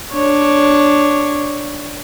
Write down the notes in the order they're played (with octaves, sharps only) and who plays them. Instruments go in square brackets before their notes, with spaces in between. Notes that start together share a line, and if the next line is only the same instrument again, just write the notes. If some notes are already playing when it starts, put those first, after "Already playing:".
[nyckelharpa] D4 C#5